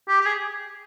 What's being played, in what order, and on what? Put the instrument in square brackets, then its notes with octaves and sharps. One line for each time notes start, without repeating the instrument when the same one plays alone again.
[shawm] G4
G4
G#4